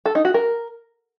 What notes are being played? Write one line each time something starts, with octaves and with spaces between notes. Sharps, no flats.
A4
D#4
F#4
A#4